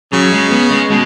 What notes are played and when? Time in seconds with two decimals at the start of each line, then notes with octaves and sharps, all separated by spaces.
0.13 C#3 F#3
0.32 G#3
0.51 B3
0.70 G#3
0.90 B2 G#3